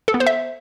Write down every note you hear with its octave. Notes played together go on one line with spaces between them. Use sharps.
A4
B3
C5
E5